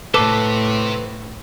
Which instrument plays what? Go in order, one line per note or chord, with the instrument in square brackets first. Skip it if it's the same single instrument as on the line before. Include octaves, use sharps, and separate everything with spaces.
[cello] A2 [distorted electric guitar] C3 [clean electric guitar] A4 B4 C5 [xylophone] A5 D6